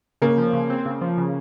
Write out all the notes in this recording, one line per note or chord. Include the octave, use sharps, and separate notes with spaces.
C#3 A#3
F3
C#3
C4
C#3
F3
C#3